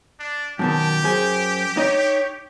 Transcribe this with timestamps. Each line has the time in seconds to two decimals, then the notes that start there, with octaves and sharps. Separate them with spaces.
0.20 D4
0.59 F#2 B2 D#3 G4 A5
1.03 F#2 G#4 C5
1.77 D#4 C#5 D#5